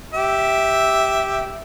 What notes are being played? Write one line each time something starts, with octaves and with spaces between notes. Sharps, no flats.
G4 E5